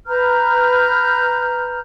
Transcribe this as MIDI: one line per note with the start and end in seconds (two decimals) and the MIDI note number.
0.07 1.80 71
0.07 1.80 82
0.07 1.80 89
0.07 1.80 91